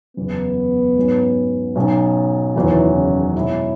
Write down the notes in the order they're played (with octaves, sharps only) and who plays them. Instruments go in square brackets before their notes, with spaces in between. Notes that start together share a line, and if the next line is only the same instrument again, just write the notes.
[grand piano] F#1 E2 C#3 [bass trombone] B3
[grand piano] G#2 F#3 C#4
B1 B2 F#3 C#4 G#4
[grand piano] F#1 E2 D#3 F#3 C#4 [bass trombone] E3
[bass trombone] C#3
[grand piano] B2 G#3 C#4 E4